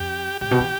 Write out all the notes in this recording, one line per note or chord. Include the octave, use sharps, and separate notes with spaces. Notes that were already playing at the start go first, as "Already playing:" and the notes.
Already playing: F2 G4
A2 G4
B2
E3